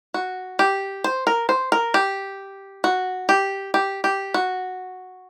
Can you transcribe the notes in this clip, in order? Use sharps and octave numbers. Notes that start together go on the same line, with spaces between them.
F#4
G4
C5
A#4
C5
A#4
G4
F#4
G4
G4
G4
F#4